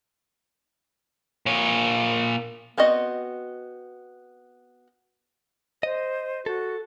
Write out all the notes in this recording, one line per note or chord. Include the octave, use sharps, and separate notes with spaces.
A#2 C#5
B3 C4 F#4 D#5
C5 D#5
F#4 A4